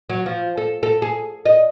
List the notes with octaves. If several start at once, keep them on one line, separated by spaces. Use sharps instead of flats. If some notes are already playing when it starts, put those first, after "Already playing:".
F#3
F3
A4
A4
G#4
D#5